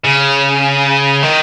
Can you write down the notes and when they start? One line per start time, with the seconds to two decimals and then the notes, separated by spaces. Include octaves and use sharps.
0.04 C#3
1.23 D#3